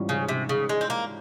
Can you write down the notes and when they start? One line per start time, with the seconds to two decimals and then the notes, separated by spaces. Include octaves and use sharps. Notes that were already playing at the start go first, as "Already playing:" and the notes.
Already playing: G#2 E3 G3 C#4 F4
0.09 C#3
0.29 C3
0.49 C#3
0.69 G#3
0.81 C4
0.90 A#3